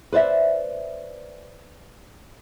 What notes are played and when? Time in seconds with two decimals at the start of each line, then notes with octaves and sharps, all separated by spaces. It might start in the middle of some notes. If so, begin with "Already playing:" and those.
0.12 B4 C5 D5 E5